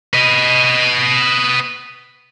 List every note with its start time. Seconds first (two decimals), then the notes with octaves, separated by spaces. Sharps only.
0.14 B4 D#5